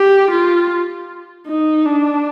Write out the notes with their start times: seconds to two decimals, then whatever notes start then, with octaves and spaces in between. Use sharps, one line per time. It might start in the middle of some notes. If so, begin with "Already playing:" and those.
Already playing: G4
0.31 F4
1.47 D#4
1.85 D4